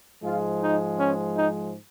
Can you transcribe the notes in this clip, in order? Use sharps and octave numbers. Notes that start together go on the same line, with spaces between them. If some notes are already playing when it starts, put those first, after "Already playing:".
G#2 F3 G#3 F4
D#4
C#4
D#4